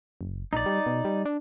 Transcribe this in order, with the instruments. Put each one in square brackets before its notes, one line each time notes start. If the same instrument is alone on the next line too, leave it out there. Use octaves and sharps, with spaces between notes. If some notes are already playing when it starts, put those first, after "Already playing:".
[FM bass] F#1
[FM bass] A#1 [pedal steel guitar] D#4 D5
[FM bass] G3
B2
G3
D4